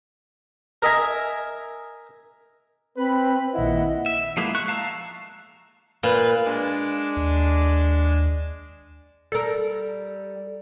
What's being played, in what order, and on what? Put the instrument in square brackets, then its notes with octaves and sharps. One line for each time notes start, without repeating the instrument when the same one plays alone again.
[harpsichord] A#4 D#5 E5 G#5
[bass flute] C4 [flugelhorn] B4 [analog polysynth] B5
[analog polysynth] A#1 D#3 F#5 [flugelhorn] E4 [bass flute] D#5
[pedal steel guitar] E5
F3 G#3 A#3 B3 E4
C#6 F#6
F5 A5 A#5 E6
[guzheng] A#2 [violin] B4
[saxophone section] G#3 D4
[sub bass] D#2
[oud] G3 A#4 [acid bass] A4